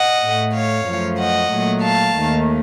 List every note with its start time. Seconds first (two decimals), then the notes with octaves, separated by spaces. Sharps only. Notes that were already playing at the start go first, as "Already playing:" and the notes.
Already playing: D#5 F#5
0.22 A2 A3
0.53 C#5 F5
0.86 F#2 F3 A3
1.18 D#5 F#5
1.50 A#2 F#3 A3
1.82 F5 A5
2.15 D#2 D#3 A3